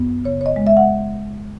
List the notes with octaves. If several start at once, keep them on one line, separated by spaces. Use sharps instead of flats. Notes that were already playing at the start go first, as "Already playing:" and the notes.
Already playing: F#2 B3
C#3 C#5
C#5
D#5
G#3
E5
F#5